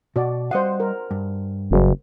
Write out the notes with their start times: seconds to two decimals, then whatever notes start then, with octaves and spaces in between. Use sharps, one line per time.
0.16 B2 F#4 D5
0.51 G3 C5 D#5 F5 F#5
0.80 A#4
1.11 G2
1.71 F#1